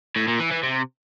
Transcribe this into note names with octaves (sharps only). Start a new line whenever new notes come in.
A2
A#2
E3
E3
C3